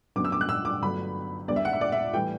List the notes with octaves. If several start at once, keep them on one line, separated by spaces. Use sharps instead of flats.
F#2 D3 F#3 B3 D6
E6
D6
F#6
E6
D6
G1 G2 F#3 A3 B5
E2 D3 G3 B3 D5
E5
F#5
E5
D5
E5
A2 E3 G3 G5